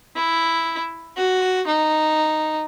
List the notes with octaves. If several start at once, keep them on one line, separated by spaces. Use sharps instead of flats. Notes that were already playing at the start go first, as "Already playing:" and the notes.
E4
F#4
D#4